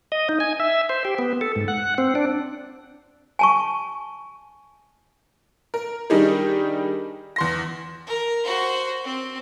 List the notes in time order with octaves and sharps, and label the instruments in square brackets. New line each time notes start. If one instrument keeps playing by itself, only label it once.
[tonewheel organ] D#5
D#4
G#5
E5
C5
G4
B3
A4
G#2
F#5
C4
D4
[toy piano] G#5 A5 C#6
[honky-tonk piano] A#4
D#3 G3 D4 D#4 G4 G#4
E2 C6 A#6
[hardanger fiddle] A#4
F#4 C5
C4